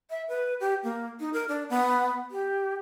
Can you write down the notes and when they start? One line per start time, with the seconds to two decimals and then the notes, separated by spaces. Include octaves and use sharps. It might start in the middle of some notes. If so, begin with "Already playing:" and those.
0.10 E5
0.28 B4
0.60 G4
0.84 A#3
1.20 D#4
1.33 A#4
1.49 D4
1.69 B3
2.31 G4